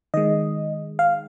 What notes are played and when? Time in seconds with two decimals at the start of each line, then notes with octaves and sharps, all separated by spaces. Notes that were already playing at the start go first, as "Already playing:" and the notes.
0.14 D#3 G#3 D#5
0.99 F5